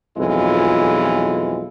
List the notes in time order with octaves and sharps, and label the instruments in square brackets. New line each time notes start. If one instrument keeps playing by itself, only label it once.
[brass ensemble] B1 F2 E3 G#3 F4